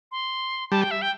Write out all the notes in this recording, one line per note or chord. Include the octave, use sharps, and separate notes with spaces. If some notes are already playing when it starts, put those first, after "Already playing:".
C6
G3 A5
G5
E5
G5